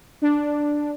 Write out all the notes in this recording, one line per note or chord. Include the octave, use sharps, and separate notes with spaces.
D4